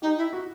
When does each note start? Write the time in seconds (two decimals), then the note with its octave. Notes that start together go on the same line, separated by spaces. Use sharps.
0.02 D#4 G4
0.17 E4
0.33 F#4